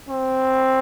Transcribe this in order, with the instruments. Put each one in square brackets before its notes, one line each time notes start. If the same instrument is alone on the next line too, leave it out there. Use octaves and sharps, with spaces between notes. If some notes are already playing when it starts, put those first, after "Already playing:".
[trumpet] C4